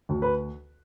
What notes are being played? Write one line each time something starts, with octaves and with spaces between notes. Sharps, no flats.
D2
B4